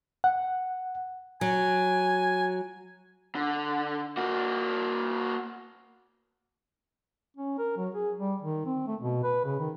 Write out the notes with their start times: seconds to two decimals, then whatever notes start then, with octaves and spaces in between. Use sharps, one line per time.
0.24 F#5
1.41 F#3 G#5
3.35 D3
4.17 A#3 F#4
7.37 C#4
7.58 A#4
7.77 F#3
7.95 G#4
8.18 G3
8.42 D#3
8.66 C4
8.87 A3
9.01 B2
9.23 B4
9.45 C#3
9.59 D#3